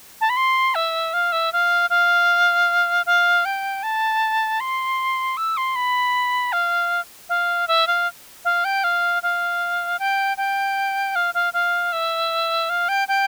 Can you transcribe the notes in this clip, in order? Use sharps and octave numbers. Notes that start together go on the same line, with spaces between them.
A5
B5
C6
E5
F5
E5
F5
F5
F5
G5
A5
C6
E6
C6
B5
F5
F5
E5
F5
F5
G5
F5
F5
G5
G5
F5
F5
F5
E5
F5
G5
G5